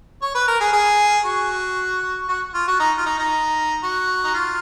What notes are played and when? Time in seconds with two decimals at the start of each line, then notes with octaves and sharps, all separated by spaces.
0.22 C#5
0.35 B4
0.48 A#4
0.60 G#4
0.73 G#4
1.26 F#4
2.29 F#4
2.54 F4
2.68 F#4
2.80 D#4
2.97 F4
3.06 D#4
3.19 D#4
3.83 F#4
4.24 D#4
4.34 F4